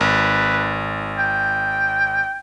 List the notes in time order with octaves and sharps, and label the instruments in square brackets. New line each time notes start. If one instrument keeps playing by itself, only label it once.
[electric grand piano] G#1 [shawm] B4
[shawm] G5